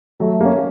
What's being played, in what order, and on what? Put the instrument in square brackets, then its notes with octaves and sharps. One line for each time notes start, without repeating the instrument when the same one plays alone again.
[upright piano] F#3 [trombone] A3
[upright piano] A#3 C#4